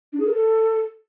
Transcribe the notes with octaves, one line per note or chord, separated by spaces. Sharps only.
D4
G#4
A#4
A4